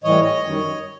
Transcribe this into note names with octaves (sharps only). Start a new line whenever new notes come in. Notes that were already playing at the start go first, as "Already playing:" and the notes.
A2 E3 G3 C#5 D#5
C#5 D#5
F#2 D#3 G3